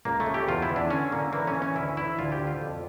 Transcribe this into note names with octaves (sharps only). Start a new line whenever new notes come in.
C#2 A#3
A3
C#3
G4
E2 F4
E4
E2
D4
D3 C#4
D3 A#3
E3 A#3
C#4
E3
C#4
D2 E4
E3 E4
D2 F4
G4
D3
F4
F2